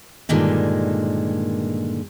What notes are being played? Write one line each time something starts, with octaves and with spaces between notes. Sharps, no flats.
G2 A#2 D3 D#3 G#3